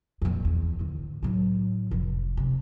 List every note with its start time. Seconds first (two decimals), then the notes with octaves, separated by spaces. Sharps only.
0.22 F2 A#2
0.45 E2
0.79 D2 A2
1.23 A2 F#3
1.91 F1 F3
2.37 C3